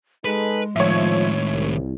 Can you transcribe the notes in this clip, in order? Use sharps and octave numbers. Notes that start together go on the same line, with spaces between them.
G#3 D#4 G#4 A4 B4
A2 D#3 F3 C#5 E5
C2